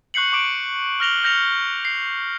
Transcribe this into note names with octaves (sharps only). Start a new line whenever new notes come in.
C#6 F#6 G6 C7 C#7 F#7
C#6 D6 D7
F6 A#6 F7 G7
F6 G6 A#6 C#7 F7 G7
C7